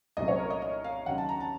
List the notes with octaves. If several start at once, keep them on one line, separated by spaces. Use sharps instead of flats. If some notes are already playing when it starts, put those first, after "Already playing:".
C2 A#2 F#3 A3 C#4 D#5
C#5
A#4
D#5
D#5
F5
D#2 C#3 F#3 F#5
A5
A#5
A5